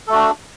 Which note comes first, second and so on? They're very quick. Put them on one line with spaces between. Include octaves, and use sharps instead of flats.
A4 A3 F#4 D4